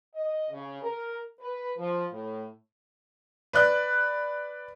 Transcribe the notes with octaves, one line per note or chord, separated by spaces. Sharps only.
D#5
C#3
A#4
B4
F3
A2
B4 D5 F#6